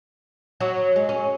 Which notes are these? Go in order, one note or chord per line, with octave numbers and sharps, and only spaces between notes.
F#3
G#3
C#4